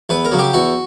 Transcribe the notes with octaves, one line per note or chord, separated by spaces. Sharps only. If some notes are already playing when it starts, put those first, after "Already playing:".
E2 B4
A#4
C#3 F#3
G4
E2 F#4